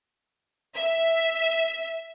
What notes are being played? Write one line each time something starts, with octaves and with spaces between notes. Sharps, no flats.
E5